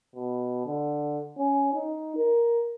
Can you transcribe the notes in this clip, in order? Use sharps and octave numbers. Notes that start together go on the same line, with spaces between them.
B2
D3
C#4
D#4
A#4